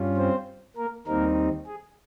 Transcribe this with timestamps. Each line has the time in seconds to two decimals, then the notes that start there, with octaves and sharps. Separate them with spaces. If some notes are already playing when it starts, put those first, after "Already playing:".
Already playing: G2 G3 C#4 F4
0.17 C4 C5
0.76 A#3 A#4
1.06 D#2 D#3 G3 A#3 C4 D#4 A#4
1.66 G#4